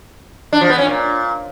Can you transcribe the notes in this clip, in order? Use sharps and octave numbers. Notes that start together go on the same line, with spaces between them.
D4
F3
B3
C#4
A#2